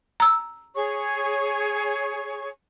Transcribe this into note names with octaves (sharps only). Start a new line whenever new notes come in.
A#5 E6
G#4 C#5 C#6